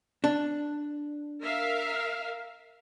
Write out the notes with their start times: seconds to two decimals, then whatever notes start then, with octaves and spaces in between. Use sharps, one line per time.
0.24 D4
1.42 A#4 E5 F5